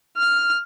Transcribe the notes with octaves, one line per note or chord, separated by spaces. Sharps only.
F6